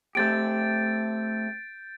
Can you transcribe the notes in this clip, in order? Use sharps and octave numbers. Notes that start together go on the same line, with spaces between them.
A3 C4 G4 G6 A6 D7